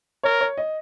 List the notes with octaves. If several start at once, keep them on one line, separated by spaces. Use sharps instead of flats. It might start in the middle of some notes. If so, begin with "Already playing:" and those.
A#4 C#5
C#5
D#5